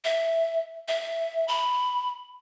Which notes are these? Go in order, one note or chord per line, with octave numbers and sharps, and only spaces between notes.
E5
E5
B5